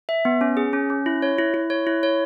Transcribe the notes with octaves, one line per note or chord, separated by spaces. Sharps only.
E5
B3
C#4
G#4
C#4
C#4
E4
C#5
E4
E4
C#5
E4
C#5